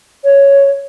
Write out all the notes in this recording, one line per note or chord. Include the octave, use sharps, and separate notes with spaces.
C#5